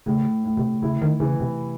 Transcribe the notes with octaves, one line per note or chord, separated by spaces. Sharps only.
A2 C#3
A2
C3
C#3 E4
D#3
C#3 E3
C3